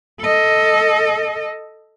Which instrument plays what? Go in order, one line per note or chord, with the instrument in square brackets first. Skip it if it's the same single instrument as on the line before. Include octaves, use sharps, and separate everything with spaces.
[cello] A4 D#5